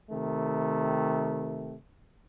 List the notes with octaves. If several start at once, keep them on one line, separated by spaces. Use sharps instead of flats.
C3 D#3 A3